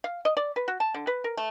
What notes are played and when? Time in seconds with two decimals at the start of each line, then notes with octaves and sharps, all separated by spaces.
0.04 F5
0.25 D#5
0.37 D5
0.56 B4
0.68 F#4
0.80 A5
0.94 D3
1.07 B4
1.24 A#4
1.37 A3